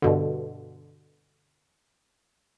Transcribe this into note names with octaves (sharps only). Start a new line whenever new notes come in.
G2 B2 D3